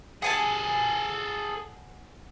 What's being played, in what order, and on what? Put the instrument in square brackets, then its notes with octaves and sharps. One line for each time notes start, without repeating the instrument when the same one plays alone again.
[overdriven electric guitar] G#4 A4 [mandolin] F#5 G#5 A5